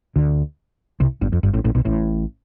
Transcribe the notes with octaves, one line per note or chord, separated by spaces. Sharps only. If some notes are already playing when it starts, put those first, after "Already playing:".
D2 D3
C2 C3
G1 G2
F2
G1 G2
A1 A2
A1 A2
B1 B2
A1 A2